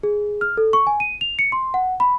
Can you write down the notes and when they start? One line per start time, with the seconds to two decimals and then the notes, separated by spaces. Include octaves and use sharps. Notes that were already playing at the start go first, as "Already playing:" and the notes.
0.03 G#4
0.41 F6
0.57 A4
0.73 C#6
0.87 G#5
1.00 D#7
1.21 F7
1.39 C#7
1.52 C6
1.74 F#5
2.00 B5